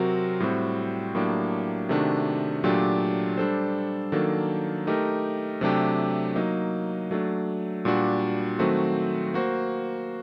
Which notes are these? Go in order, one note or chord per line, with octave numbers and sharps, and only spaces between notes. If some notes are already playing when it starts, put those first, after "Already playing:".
Already playing: C3 F#3 C4 F#4 A#4
A2 G3 C4 F#4
A2 F#3 A#3 D4 G4
C3 D#3 A3 D4 F#4
A#2 F#3 A3 D4 G4
G3 D4 A4 C5
D#3 F#3 A#3 D4 A4
A3 D#4 G4 A#4
C3 F#3 A3 D4 G4
F#3 A#3 D#4
F#3 A3 D4
A#2 G3 D4 F#4
D#3 F#3 A3 C4 F#4
A#3 F#4 C5